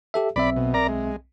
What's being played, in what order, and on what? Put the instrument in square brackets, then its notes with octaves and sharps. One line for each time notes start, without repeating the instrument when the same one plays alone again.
[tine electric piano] G4 A4 E5
[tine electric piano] B1 C4 E5 [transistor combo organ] D5 B5
[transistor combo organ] B2
A#4 D5 A#5
G#3